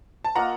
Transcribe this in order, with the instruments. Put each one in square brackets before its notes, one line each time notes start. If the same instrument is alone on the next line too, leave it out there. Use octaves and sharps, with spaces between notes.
[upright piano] A5
[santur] A#3 F4 A#4 D#5 [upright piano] F#5 A#5